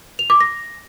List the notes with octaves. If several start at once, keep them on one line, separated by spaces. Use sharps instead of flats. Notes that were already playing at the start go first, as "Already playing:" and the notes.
F7
D6
A#6